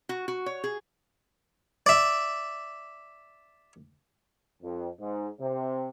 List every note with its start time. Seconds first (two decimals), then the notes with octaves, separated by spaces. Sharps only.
0.09 F#4
0.28 F#4
0.46 C#5
0.64 G#4
1.86 D5 E5
4.63 F2
5.00 G#2
5.40 C3